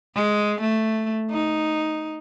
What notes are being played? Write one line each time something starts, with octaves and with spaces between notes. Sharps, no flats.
G#3
A3
D#4